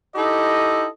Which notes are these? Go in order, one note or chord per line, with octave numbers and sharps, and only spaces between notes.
D#4 E4 G4 A4 D#5